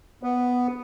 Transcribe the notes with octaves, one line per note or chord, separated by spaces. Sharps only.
B3